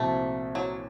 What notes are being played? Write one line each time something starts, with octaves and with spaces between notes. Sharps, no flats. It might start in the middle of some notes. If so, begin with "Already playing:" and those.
Already playing: C2 A#2 F3 A3 C4 F#4
F#3